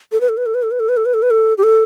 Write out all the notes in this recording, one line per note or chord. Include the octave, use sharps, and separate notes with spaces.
A4
B4
A4
B4
A4
B4
A4
B4
A4
B4
A4
B4
A4
B4
A4
G4
A4